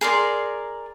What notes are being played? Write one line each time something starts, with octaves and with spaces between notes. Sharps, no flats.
G#4 A#4 D5 C6